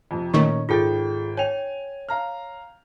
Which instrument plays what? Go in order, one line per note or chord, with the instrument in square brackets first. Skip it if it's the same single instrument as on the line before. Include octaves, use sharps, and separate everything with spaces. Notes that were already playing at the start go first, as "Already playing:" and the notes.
[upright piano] F2 C3
[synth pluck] A#2 D#3 A3 [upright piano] C#4 D#4 [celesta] C#6
[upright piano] G#1 G5 A6 [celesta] F4 G#4 A4
[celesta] C#5 G5 [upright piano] G#5 F7
[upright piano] F5 A#5 F6